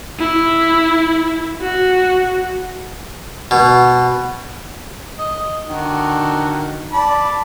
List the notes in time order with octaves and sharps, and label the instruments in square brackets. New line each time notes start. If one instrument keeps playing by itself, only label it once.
[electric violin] E4
F#4
[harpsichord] B2
[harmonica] D#5
D3 D#3 F#4
D5 A5 B5